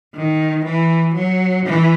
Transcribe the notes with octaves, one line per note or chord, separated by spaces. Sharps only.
D#3
E3
F#3
E3